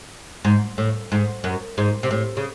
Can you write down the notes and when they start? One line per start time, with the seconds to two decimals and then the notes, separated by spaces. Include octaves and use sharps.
0.45 G#2
0.78 A2
1.12 G#2
1.44 F#2
1.78 G#2
2.03 C3
2.11 A2
2.37 C#3